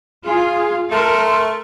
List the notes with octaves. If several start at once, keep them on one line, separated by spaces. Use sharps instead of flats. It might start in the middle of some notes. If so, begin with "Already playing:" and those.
F4 G#4
A3 A4 A#4 C6